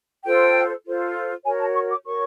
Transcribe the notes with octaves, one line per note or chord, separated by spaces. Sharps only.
F4 A4 C5 G5
F4 A4 C5
F#4 A#4 C#5 G#5
A5
C#6
D6
F#4 A#4 C#5 C#6